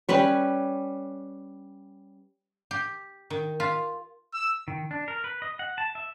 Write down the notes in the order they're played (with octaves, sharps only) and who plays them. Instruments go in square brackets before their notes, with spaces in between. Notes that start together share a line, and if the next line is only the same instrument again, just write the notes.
[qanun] G3 C#4 B4 C#5
[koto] G4
D#3
F4
[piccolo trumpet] E6
[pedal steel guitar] D#3
D4
A#4
B4
D#5
F#5
A5
E5